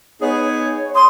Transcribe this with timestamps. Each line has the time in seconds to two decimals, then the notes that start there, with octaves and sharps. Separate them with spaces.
0.22 B3 D#4 G#4 C#5
0.95 C6 D#6